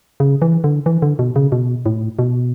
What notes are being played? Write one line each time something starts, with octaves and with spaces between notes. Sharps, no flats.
C#3
E3
D3
E3
D3
B2
C#3
B2
A2
B2